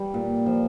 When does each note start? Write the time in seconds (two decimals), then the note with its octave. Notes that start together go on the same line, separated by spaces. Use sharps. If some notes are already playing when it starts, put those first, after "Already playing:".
Already playing: G3
0.14 A#2
0.46 F3